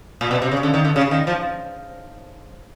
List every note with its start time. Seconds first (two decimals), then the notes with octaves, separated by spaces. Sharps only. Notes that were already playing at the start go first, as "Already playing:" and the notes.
0.21 A#2
0.31 B2
0.42 C3
0.51 C#3
0.63 D3
0.74 D#3
0.85 D3
0.96 C#3
1.11 D#3
1.27 F3